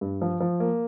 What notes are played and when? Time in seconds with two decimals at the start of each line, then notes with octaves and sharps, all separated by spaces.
0.01 G2
0.22 F3
0.40 F3
0.60 A#3